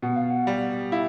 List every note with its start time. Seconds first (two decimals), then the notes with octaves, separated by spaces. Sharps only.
0.02 B2 F#5
0.16 F5
0.30 F#5
0.47 G3
0.92 E4 F5